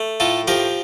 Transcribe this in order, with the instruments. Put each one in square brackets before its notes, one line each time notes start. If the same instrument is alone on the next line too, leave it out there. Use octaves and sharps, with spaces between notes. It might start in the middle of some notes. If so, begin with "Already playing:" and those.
Already playing: [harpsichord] A3
A2 F4 A4
F3 G4 A#4